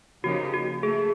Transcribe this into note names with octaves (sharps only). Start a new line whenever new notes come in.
C#3 F3 A#3 D#4 F#4 G4
F#4
A3 G#4